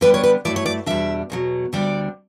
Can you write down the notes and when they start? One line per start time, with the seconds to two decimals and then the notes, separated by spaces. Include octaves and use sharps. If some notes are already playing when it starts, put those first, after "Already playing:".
0.01 D3 G3 B3 D4 B4
0.14 C#5
0.23 B4
0.45 G2 F#3 A3 E4 D5
0.56 C#5
0.66 D5
0.86 E2 B2 G3 D4 E5
1.30 E2 B2 F#3
1.73 D2 D3 G3 D4 D5